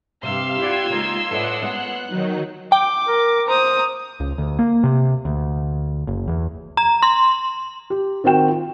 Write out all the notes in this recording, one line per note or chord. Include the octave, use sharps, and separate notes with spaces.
G2 C3 F5 C6 E6
E4 F4 G4 D5 F#5 G#6
C#3 G#3 A#3 D#4 A#5
A2 E4 A4 B4 D5 D#5 F#5
G#3 A#3 B3 C#4 F#6
D#3 F#3 D#4
G5 D6
A#4
C5 A#5 D#6
C#2
D2
A#3
C3
D2
F#1
E2
A#5
C6
G4
D#3 C4 F#4 G5 E7
F4